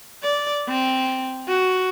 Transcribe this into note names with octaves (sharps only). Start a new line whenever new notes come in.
D5
C4
F#4